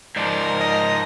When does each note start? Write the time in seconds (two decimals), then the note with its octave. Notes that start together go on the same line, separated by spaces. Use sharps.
0.16 G#2 F3 A#4 D5
0.61 D#5